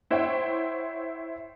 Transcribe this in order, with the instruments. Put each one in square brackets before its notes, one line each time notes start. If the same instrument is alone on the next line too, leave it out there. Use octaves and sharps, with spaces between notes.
[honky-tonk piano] E4 C5 C#5 E5 F#5 G5